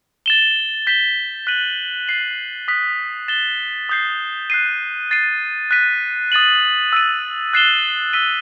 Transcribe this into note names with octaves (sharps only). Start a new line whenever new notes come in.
A6 E7 G7
G6 B6 E7 G7
F#6 B6 D#7 F#7
A6 C7 F#7
D#6 F#6 B6
A6 E7 G7
D#6 G6 C7
F#6 C7 D#7
A6 C7 D#7
F#6 B6 D#7
D#6 A6 D#7 F#7
E6 A6 D#7
F#6 A6 C7 E7 G7
E6 B6 D#7 G7